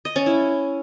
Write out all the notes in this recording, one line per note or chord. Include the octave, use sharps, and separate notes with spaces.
D#5
C#4
E4